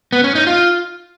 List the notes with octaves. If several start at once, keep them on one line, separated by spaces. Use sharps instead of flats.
B3
C#4
D#4
F4